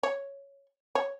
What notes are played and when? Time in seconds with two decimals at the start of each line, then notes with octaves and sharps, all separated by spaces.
0.03 C#5
0.95 C#5